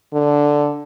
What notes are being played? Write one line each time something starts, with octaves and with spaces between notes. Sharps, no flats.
D3